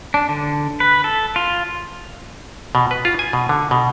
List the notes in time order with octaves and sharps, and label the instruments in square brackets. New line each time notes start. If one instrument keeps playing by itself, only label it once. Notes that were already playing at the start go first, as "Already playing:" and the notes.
[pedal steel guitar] D4
D3
B4
A4
F4
[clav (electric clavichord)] B2
B4
F4
G#5
B2
D3
B2